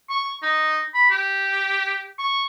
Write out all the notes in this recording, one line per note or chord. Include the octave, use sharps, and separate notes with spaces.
C#6
D#4
B5
G4
C#6